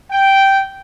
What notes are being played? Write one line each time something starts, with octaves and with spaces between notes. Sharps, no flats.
G5